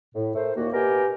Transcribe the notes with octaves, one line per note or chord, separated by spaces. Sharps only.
A2
A3 A#4 C5
D#2 A#2 A#3 F#4
B2 B3 G4 A#4 G#5